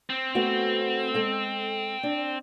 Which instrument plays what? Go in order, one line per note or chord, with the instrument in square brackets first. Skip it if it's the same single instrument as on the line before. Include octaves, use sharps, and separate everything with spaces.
[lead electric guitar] C4
[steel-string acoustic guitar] A3 B3 F#4
G#3 A4 G5
D4